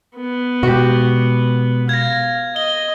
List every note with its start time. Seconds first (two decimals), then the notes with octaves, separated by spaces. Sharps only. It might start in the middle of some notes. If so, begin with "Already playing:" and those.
0.15 B3
0.63 B2 G#3 F#4 G4
1.89 F5 G#6 A#6
2.56 D#5 G7